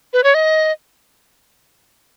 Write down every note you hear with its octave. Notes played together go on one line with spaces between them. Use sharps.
B4
C#5
D#5